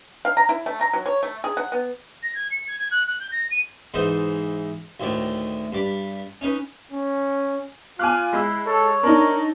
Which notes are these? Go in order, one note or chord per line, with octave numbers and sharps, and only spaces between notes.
F5
A#5
E4
A3
A#5
F#3
C#5
A3
G#4
F#5
B3
A#6
G#6
C#7
G#6
G#6
F#6
F#6
G6
A#6
D#7
G#2 E3 D#4 C5 D#5
D2 A2 D#3 D5
G2 D5 B5
C#4 D#4 B4
C#4
F4 F5 G#5 D6 F#6
G#3 E4 E6
A4 C#5
D4 D#4 A#4